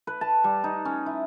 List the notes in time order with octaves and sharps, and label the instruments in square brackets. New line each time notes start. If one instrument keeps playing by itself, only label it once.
[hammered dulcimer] B4
A5
G3
D#4
C#4
E4